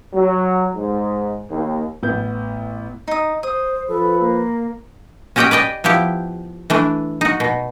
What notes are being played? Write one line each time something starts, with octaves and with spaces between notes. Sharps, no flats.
F#3
G#2
D#2
A1 B3 G6
D#4 D#6
C5 D#6
F3 A4 B4
A#3
C#4 F#4 G4 D#5 F#5 G5
B4 D5 D#5 G5
F3 B3 E4 G4
E3 A3 D4
D#4 F#4
B2